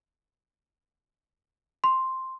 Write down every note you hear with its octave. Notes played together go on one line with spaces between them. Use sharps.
C6